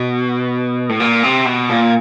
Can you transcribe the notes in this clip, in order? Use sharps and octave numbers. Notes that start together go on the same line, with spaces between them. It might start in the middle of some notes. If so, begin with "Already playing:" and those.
Already playing: B2
A2
A#2
C3
B2
A#2